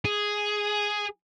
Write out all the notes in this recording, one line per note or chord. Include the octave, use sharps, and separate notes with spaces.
G#4